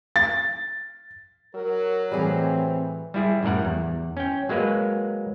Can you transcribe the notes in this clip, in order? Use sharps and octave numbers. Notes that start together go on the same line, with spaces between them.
A6
F#3 A#4
A2 E3 G3 C4 G#4
G3 E4 G#4
F#2 A2 G3 A#4 F#5
E2
C#4 G5
F#3 G#3 A#3 B4